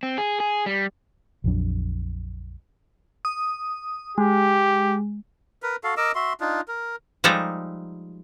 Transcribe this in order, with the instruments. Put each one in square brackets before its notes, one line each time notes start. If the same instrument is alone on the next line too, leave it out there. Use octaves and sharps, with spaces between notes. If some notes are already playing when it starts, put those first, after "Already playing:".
[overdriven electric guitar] C4
G#4
G#4
G3
[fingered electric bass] A#1 F2 F#3 D4
[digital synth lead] D#6
[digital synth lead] G#3 [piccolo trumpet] G4
[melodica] A#4 B4
F#4 A4 F5
A#4 D#5 D6 E6
F#4 E5 C6
D4 D#4 F4
A#4
[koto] F3 G3 G#3 D#4 A4 A#5